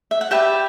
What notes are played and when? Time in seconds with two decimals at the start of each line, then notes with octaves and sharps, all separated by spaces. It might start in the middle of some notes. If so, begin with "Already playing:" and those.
0.11 E5
0.21 F#5
0.31 G4 B4 D5 E5 G5